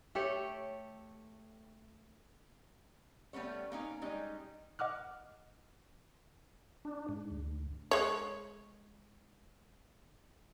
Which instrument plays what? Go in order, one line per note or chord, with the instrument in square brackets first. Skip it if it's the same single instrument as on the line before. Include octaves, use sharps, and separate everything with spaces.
[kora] A3 G4 A4 C#5
[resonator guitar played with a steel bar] G3 A3 B3 C#4 C#5
A#3 C#4 D#4
G3 G#3 C#4 D#4 D#5
[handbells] D#5 F#5 D6 F6 F#6
[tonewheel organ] D4
G#2
D2
[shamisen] G#3 C#5